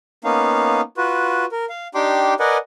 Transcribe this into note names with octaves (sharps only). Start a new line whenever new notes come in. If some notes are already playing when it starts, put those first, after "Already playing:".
A#3 B3 C#4 D#4 F5
F4 F#4 B4
A#4
F5
D4 D#4 G4 G5 C6 D6
A#4 B4 D5 D#5 F#5 G#5